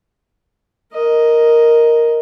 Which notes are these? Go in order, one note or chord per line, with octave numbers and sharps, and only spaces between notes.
A#4 D#5